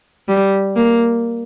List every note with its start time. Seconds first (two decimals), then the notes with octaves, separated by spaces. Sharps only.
0.28 G3
0.76 A#3